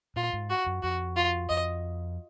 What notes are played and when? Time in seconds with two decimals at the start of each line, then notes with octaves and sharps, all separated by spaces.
0.16 A#2 F4
0.33 G#2
0.50 F#4
0.66 F#2
0.83 F2 F#4
1.16 F4
1.49 F2 D#5